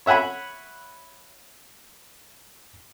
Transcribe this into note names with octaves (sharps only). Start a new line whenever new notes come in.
C#5 E5 F#5 G#5 B5